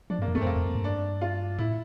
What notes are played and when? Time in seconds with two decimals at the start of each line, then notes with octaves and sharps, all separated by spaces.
0.10 F3 D4
0.19 G2 A#3
0.28 F2
0.35 A3
0.38 G2 C4
0.46 F2 A#3
0.56 E2
0.66 F2
0.75 G2
0.84 D4
1.22 F4
1.59 A2 E4